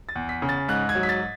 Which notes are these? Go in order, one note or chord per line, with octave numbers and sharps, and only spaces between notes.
A6
E2
B6
C#3
A6
G#2 F#6
G#6
F#3
B6
A6